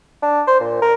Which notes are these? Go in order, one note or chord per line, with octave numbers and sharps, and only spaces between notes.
D4
C5
A#2
A#4